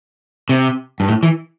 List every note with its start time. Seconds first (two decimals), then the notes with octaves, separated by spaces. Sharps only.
0.49 C3
1.00 G2
1.08 A2
1.23 E3